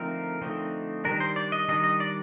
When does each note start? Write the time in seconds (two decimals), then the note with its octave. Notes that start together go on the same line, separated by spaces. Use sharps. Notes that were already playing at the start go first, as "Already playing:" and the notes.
Already playing: D3 F3 A3 C4 D#4 A#4
0.42 D3 F3 A3 C4 D#4
1.05 D#3 G3 D4 A#4
1.20 C5
1.36 D5
1.52 D#5
1.68 D#3 G3 D4 D#5
1.84 D#5
2.00 D5